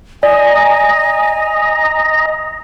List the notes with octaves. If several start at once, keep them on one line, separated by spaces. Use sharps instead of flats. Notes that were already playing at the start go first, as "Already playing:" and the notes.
D5 D#5 G#5 A#5